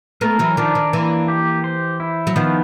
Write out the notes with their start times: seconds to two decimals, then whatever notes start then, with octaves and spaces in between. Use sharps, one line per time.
0.21 A3 B3 A#4
0.39 E3 F#3
0.57 D#3 F3 D4
0.75 D#3
0.93 E3 A#3
1.28 G4
1.64 C5
2.00 E4
2.27 F#3
2.36 D#3 F3 B3